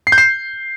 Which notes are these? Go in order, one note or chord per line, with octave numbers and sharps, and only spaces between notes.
C7
G6
C7